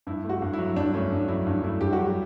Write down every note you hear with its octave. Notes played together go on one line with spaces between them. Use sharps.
G2 E4
A3
F#4
G2
E4
F#3
G2 D4
A3 C#4
G2
F#3 E4
G2
A3 E4
G2 G4
F#4
F#3 G4